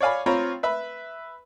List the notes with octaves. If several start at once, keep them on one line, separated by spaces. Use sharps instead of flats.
C#5 D5 F5 G#5 B5
C4 F4 C#5 A#5 B5
B4 E5 B5